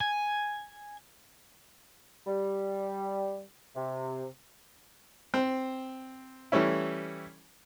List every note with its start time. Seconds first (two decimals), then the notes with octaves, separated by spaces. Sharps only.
0.01 G#5
2.27 G3
3.76 C3
5.34 C4
6.52 E3 G3 A3 C#4 E4